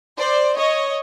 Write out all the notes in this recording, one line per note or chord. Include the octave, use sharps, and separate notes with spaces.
C5 D5
C#5 D#5